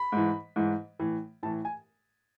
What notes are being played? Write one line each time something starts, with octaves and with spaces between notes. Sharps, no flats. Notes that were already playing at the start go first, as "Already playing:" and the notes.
Already playing: B5
G#2 E3
G#2 E3
A2 E3
A2 E3 A5
G#5